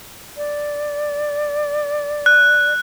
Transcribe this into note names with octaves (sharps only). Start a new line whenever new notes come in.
D5
F#6